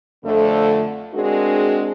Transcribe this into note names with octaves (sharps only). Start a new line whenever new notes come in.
F2 D3 A3
G#3 C4 D4 F#4 G#4 A#4